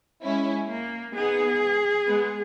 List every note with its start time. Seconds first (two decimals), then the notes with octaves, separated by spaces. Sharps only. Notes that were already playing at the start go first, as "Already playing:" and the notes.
0.23 G#3 C#4 E4
0.69 A#3
1.15 B3 D#4 G#4
2.08 G#3 B3